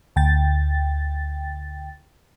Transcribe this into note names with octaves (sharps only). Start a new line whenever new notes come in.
D2 G5 A6